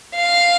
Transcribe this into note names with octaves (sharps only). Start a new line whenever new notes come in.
F5